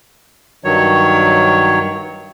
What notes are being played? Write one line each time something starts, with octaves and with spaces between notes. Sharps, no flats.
G2 D#3 F#3 C#5